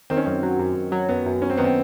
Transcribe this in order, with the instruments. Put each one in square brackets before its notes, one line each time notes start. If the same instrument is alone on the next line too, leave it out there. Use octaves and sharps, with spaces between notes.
[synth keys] D#3 [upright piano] C4
[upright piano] C#4
[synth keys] F#2 [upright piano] C4
[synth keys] F#3
F#2
F#2
F#3
[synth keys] F#2 [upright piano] B3
[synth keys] F#2
[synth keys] F#2 [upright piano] C#4
[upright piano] C4
[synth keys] D#3 [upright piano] B3
[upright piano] C4